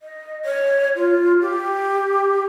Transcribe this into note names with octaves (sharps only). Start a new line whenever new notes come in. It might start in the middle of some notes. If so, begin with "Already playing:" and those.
D#5
C#5
F4
G4